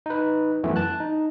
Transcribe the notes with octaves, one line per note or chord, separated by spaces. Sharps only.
D#4 B4
F#2 E3 A3 B3
A5 F#6
D#4